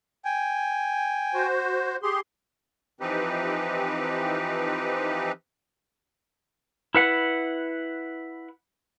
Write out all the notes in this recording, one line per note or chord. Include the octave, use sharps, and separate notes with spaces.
G5 G#5
F#4 C5
G4 G#4 C6
E3 F3 C4 D#4 G4 B4
E4 B4 F#5